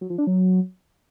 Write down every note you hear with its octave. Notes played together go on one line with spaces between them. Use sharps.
F#3
F3
D4
F#3